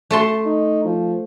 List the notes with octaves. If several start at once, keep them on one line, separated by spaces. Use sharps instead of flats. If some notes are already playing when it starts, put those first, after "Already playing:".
A3 A5 C6
D#4
F3